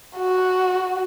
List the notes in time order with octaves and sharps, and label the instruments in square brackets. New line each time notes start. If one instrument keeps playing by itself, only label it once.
[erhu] F#4